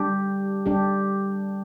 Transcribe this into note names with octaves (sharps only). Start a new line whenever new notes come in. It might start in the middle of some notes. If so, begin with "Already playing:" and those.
Already playing: G3 D4 G4
G3 D4 G4